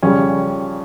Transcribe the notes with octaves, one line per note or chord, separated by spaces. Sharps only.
F2 C#3 G3 C#4